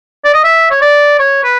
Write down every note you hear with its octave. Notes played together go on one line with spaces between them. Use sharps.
D5
D#5
E5
C#5
D5
C#5
B4